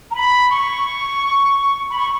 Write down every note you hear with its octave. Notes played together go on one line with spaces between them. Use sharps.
A#5
B5
C#6
B5
C#6